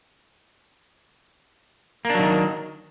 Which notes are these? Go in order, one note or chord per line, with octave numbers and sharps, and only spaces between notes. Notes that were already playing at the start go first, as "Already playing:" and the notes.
D#3 F#3 A#3 D4